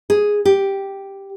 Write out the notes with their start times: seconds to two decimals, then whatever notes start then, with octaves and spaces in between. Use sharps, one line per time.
0.10 G#4
0.45 G4